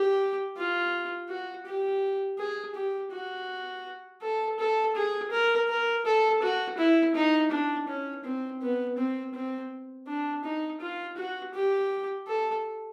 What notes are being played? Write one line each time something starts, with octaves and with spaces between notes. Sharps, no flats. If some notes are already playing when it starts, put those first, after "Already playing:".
Already playing: G4
F4
F#4
G4
G#4
G4
F#4
A4
A4
G#4
A#4
A#4
A4
F#4
E4
D#4
D4
C#4
C4
B3
C4
C4
D4
D#4
F4
F#4
G4
A4